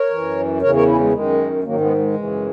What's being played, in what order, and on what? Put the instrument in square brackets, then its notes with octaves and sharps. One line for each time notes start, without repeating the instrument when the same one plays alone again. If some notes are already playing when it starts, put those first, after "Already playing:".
Already playing: [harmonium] A#4 C#5
F#2 E3
E2 C#3 E3 A#4 C#5
A#4 C#5
C#4 E4
G#3
F#2 D#3 G#3
G#2 D#3 F#3 A#3
G#3 B3
G#3
F#2 C#3 E3